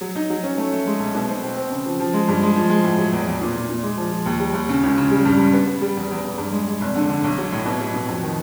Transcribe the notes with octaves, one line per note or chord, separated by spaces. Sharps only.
F#3
D#4
F#3
C#4
A3
A3
G#3
B1
B2
C4
C4
C4
C#3
F3
F3
G#3
G2
G#3
F3
G#3
A2
F#3
E2
E2
A#2
A#2
A#2
G#3
F3
F3
D#2
G3
D#2
C#3
C#2
C#3
G3
G2
G2
B3
B3
G3
E2
E2
E1
G2
G#3
G#3
F1
D3
D3
B1
F#3
A2
B2
F#3
B2
F2
D#3